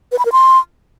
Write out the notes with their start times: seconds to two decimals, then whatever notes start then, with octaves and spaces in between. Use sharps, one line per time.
0.12 B4
0.19 B5
0.25 A#4
0.32 C6